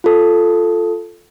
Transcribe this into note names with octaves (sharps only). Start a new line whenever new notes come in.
F4 A4